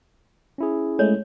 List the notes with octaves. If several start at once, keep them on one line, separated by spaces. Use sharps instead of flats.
C#4 E4 G#4
G#3 A3 C#5